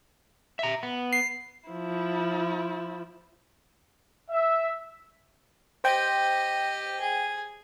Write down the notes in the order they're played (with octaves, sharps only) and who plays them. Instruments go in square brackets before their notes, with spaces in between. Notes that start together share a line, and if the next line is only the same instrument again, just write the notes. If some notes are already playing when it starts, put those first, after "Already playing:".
[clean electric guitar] E5 A#5
B3
[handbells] C7
[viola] F3 E4
[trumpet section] E5
[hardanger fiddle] G4 D#5 [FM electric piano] C5 G5
[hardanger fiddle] G#4